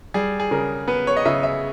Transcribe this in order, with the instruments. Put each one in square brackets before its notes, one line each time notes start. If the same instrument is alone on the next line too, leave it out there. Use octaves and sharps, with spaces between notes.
[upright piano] G3 G#4
G#4
C#3 A#4
B3 B4
C#5
D#5
C#3 E5
E5